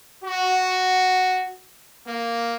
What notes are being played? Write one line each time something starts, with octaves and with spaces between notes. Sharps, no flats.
F#4
A#3